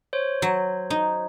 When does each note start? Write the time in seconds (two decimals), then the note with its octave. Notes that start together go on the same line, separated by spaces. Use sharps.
0.13 C5 C#5
0.42 F#3
0.90 D#4